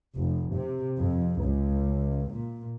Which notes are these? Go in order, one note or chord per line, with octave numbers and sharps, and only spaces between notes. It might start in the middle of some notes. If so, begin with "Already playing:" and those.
F1
C3
F2
C#2
A#2